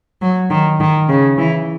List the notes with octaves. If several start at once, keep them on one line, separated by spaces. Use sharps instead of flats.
F#3
D#3
D#3
C#3
E3